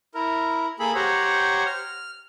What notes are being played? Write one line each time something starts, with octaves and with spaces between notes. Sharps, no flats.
E4 A#4
A#3 G#4 A4 B5
G4 C5 C#5 F#5 A#5
F6